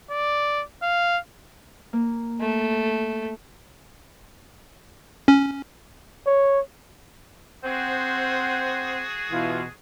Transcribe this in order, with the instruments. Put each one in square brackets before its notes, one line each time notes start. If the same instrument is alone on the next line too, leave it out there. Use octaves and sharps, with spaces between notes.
[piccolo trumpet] D5
F5
[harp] A#3
[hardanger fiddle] A3
[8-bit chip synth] C#4
[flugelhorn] C#5
[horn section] C4 C5 F#5 [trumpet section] F#4 G#4
[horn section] B2 E3 F4